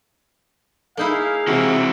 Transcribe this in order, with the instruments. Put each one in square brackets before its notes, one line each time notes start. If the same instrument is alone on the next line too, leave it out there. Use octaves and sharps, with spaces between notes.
[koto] A#3 D#4 E4 [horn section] G#4 F5
[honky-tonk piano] C3 [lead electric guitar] E3 F#4